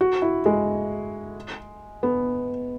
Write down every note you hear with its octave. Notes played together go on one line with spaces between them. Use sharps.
F#4
E4
G#3
B3